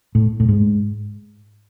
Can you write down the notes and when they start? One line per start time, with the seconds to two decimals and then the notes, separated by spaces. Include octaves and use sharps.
0.15 A2
0.40 A2
0.49 G#2